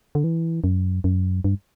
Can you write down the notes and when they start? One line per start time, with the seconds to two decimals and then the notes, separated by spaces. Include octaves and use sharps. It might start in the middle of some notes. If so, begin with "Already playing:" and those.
0.15 D3
0.24 E3
0.64 F#2
1.04 F#2
1.44 G2